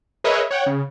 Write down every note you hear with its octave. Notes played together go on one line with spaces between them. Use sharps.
G#4 A#4 B4 C#5 D#5 E5
C#5 F#5 G5
C#3